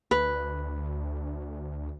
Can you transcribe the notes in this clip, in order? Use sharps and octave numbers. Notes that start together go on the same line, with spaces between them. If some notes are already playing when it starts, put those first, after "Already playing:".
D2 B4